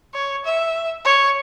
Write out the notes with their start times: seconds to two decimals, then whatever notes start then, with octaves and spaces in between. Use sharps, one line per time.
0.14 C#5
0.45 E5
1.05 C#5